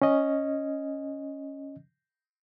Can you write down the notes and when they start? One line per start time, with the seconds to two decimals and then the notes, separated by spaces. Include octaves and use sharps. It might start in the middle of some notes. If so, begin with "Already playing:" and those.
0.02 C#4 D#5